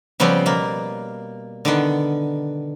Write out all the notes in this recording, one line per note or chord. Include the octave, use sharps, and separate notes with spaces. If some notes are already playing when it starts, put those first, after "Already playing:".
C#3 F3 G3 B3 C4
B2 A#3
D3 D#3 B3